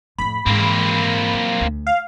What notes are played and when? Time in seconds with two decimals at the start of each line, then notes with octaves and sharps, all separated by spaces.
0.18 F2 A2 B5
0.46 G#2 E3 A#3 C4
1.33 F#3
1.61 D2
1.87 F5